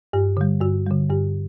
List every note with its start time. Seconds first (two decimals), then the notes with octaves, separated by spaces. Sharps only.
0.13 G2 G4
0.37 D3 G3
0.61 G2 F#4
0.86 D3 G3
1.10 G2 G4